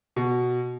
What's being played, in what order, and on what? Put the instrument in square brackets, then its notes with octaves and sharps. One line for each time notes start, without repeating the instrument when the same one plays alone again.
[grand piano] B2